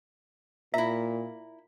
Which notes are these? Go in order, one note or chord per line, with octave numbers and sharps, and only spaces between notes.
A#2 E4 E5 A#5